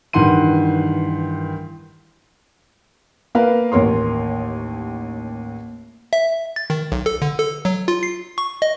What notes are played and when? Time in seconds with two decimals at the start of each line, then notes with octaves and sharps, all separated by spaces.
0.13 G2 D#3 E3 F#5 C6 D#7
3.35 A#3 A#4 B4 F5
3.72 A1 D#2 A#4 C#5 C6
6.13 E5
6.56 A6
6.70 D#3
6.92 B1
7.06 A4
7.22 D3
7.38 A4
7.65 F#3
7.88 F4
8.03 C7
8.38 C#6
8.62 D#5